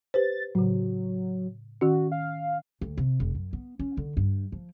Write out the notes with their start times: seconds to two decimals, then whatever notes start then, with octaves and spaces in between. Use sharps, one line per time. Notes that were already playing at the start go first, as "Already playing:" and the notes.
0.14 G4 B4 C5 A6
0.55 A2 C#3 F#3
1.81 D#3 C#4 F#4
2.12 F5
2.81 D2
2.97 C3
3.20 F1
3.35 F#2
3.53 B3
3.79 C#4
3.97 D3
4.17 G2
4.52 F3